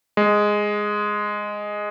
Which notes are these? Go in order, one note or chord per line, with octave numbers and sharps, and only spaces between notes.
G#3